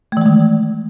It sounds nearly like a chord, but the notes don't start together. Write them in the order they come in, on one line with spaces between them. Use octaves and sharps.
A3 E3 G#3 D#3